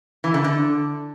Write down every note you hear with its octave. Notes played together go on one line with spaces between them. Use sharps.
E3
D3
D3